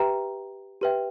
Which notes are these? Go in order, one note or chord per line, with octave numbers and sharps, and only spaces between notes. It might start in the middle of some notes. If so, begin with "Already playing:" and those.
Already playing: G4 B4 E5 G5 A#5
G4 B4 E5 G5